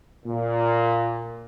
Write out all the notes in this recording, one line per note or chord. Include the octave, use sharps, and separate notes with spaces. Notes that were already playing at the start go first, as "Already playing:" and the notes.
A#2